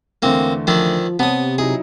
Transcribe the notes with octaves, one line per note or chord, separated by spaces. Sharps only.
E2 D3 A3 A#3 C4
D#3 F3 D4 E4
C3 B3 C#5 A5 D#6
F#3 D#4 E4 G#4